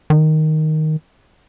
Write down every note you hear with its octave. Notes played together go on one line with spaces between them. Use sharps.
D#3